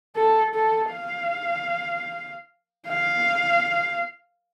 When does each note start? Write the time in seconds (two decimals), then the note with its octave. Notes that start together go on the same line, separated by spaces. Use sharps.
0.16 A4
0.54 A4
0.93 F5
2.89 F5